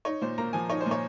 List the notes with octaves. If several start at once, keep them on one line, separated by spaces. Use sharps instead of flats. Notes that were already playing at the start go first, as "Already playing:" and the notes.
D#4 C#5
A#2 C5
A#3 A#5
F3 G#5
D#4 C#5
C5
A#2
C#5